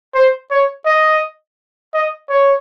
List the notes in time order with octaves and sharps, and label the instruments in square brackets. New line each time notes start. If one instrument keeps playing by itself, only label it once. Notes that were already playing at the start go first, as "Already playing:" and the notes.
[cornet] C5
C#5
D#5
D#5
C#5